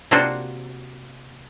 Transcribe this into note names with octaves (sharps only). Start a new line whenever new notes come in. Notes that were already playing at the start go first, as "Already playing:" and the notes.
C3 A#3 D4 F4 F#4 C5